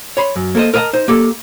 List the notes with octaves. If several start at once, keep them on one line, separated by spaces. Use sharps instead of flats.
C#5 B5 C6
F#2
A#3 A4 A#4 C5 D#5
A#4 B4 D#5 F5 A5 A#5
D#4 C5
A#3 G4 A4